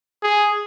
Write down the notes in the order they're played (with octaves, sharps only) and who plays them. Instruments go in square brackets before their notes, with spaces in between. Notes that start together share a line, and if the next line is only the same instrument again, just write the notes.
[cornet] G#4